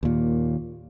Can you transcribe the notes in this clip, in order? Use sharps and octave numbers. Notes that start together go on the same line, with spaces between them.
D#2 A#2